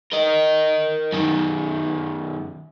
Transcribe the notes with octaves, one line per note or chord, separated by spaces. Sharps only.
A#4 D#5
F#2 D#3